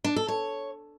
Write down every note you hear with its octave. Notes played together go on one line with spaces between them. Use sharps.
D4
A4
C#5